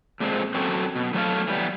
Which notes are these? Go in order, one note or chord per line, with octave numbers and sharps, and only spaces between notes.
A#2 G#3 A3 C4
F#2 F#3 C4 F#4 A4
B2
A2 F#3 A4 C5 C#5 F5
E3 G3 B3